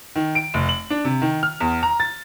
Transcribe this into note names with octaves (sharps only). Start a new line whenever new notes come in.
D#3
D7
F1
F#7
D4
C3
D#3
F6
E2
A#5
A6